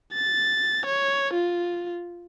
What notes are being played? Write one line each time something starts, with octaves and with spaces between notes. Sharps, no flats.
A6
C#5
F4